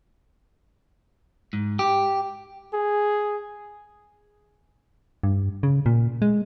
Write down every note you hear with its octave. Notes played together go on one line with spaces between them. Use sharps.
G#2
G4
G#4
G2
C#3
A#2
G#3